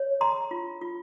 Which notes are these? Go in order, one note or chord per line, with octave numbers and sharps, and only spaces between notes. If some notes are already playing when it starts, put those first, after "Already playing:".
Already playing: C#5
G#4 A#5 C6
F4
F4